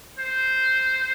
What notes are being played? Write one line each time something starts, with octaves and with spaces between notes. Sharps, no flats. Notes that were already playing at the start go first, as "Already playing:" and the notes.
C5